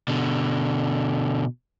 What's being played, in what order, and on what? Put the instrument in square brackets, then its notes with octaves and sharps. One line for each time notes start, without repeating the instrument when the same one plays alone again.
[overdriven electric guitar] B2 D3